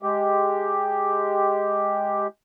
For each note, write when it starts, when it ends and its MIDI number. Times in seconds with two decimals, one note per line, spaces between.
0.02 2.27 56
0.02 2.27 67